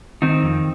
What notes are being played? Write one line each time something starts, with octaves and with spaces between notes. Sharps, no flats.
D#3 C4 D#4
F2